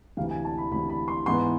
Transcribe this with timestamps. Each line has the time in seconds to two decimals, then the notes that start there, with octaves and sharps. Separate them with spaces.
0.17 D2 C3 E3 F5
0.30 G#5
0.45 A5
0.58 B5
0.71 D2 C3 E3 B5
0.89 B5
1.08 C6
1.26 G#2 E3 B3 C6